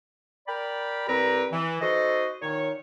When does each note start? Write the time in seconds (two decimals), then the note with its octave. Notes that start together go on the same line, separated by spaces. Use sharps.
0.48 A#4 D5 G5 B5
1.08 C2 C4 G4 B4 D5 A#5
1.52 E3
1.81 D#4 F#4 A4 C5 D#5
2.42 A#2 D#3 D#4 C#5